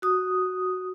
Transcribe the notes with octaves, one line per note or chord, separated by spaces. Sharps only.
F#4 D#6